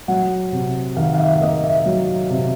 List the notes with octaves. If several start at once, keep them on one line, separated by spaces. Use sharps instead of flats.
F#3 F#5
C3
D#3 F5
F5
E5
A#3 D#5
E5
F#3
C3